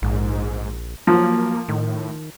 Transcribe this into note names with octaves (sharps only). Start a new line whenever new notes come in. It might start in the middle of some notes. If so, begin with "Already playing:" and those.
A#1 G#2
F3 F#3 A#3
A2 D#3